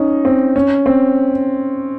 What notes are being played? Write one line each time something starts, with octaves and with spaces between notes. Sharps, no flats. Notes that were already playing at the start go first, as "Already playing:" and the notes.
Already playing: C#4 D#4
C4
C#4
C4